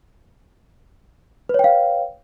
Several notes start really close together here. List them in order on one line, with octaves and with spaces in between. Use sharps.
B4 C#5 G5 F5